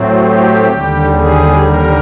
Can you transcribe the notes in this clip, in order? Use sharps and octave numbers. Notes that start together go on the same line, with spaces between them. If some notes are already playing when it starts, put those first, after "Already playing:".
Already playing: A2 F#3 A3 C4
G4
D#2 D3 G3
G#4
A#4